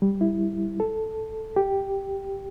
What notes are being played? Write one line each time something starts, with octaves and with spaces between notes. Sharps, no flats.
G3
E4
A4
G4